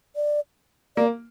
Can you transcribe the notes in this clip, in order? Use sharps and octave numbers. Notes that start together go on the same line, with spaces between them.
D5
A#3 D5